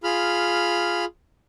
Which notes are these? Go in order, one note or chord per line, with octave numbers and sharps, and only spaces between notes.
F4 G#4 B5 F6